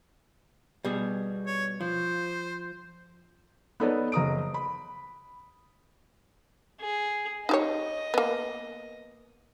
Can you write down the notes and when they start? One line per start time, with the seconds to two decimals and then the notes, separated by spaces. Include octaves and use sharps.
0.85 B2 G3 G#4
1.46 C#5
1.81 F3 C5
3.80 B3 D#4 A4 B4 C#5 D5
4.12 F#1 A#5 D#6 D7
4.54 B5
6.80 G#4
7.49 D#4 G4 C#5 D#5
8.14 A#3 B3